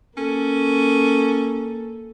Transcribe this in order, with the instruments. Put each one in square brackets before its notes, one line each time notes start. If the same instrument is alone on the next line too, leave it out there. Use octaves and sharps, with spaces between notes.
[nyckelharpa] A#3 A4 [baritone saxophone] C#4